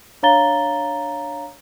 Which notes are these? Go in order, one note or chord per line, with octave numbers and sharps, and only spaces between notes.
D4 C#5 F5 A#5 A6 G7